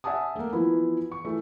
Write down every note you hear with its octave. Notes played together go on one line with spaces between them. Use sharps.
E5 F#5 G#5 A5 D#6
A3 A#3
E3 F3 B3 E4
C#6
E3 A3